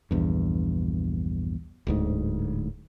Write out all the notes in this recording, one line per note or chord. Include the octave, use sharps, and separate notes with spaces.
A#1 E2 G2
D1 D2 G#2